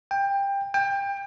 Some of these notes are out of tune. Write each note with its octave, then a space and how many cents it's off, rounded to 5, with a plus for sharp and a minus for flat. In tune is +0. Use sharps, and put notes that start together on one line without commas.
G5 +20
G5 +25